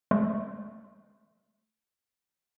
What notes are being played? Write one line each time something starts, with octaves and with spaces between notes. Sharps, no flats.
G#3 A3